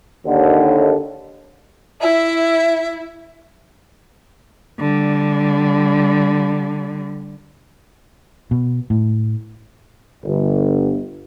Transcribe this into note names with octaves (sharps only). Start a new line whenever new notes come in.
D#2 D3
E4 E5
D3 G3
B2
A2
G1